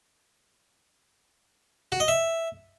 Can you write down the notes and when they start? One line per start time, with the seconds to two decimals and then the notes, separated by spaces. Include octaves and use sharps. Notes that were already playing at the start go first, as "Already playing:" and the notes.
1.92 F#4
2.00 D#5
2.08 E5